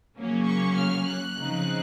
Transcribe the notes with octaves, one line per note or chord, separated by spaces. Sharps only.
C#3 F#3 A#3 C#4
C#6
F6
F#6
C#3 F3 C4 D#4